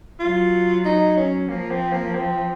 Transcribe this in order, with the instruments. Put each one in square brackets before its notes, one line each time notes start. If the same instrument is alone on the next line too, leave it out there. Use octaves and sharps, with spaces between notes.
[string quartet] F#3 [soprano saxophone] F4
[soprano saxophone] D#4
C#4
[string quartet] F3 [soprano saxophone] A#3
[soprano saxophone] C4
A#3
C4